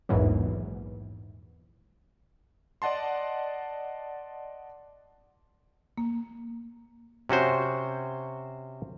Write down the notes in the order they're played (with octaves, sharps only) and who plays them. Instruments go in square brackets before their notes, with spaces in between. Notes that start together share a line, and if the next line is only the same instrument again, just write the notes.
[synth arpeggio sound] A#1 E2 G#2 E3 F#3
[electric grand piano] D5 D#5 F#5 A5 C6
[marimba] A#3
[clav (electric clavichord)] C3 C#4 F#4 C5